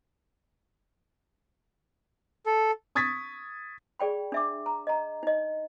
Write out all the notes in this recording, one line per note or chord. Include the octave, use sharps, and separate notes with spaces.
A4
C#6 D#6 G#6 A6 B6
G#4 D5 G5 B5
D4 E5 D6
A#5
D#5 A#5
D#4 D#5